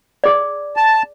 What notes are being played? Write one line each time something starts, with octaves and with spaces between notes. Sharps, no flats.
G#4 D5
A5